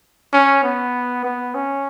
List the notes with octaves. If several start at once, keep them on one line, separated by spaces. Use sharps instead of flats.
C#4
B3
B3
C#4